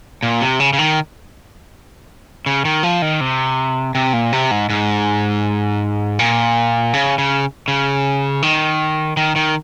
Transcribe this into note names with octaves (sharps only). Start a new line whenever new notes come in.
A#2
C3
C#3
C#3
D#3
C#3
D#3
F3
D#3
C3
C3
A#2
C3
G#2
G#2
A#2
C#3
C#3
C#3
D#3
D#3
D#3